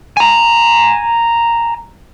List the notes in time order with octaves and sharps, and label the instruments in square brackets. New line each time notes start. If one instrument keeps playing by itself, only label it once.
[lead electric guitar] G#5 A#5